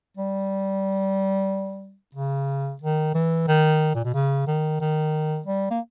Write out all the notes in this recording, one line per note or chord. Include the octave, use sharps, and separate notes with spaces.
G3
C#3
D#3
E3
D#3
A#2
B2
C#3
D#3
D#3
G3
A#3